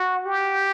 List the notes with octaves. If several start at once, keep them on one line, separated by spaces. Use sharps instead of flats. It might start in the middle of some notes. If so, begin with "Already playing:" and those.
Already playing: F#4
G4